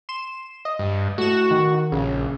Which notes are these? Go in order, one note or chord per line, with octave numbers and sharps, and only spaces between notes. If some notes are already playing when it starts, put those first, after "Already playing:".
C6 E7
D#5
G2
A2 F#4 E7
D#3
A#1 C#3